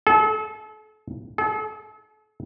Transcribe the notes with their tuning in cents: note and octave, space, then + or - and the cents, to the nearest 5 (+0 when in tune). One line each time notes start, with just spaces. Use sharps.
A4 -40
A4 -45